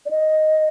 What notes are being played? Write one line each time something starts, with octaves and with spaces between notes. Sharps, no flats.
D5
D#5